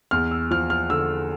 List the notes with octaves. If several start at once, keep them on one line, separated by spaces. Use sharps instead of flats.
E2 F6
E6
F3 F6
F6
D3 E6